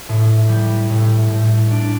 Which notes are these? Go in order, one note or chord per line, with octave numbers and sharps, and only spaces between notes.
A2
G3
A2
A2
D4